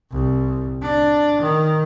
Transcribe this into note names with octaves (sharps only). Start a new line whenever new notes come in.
C2
D4
D#3